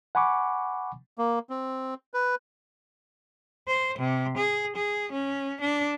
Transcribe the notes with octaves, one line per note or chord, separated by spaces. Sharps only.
F#5 G#5 B5 C#6 D6
A#3
C4
B4
C5
C3
G#4
G#4
C#4
D4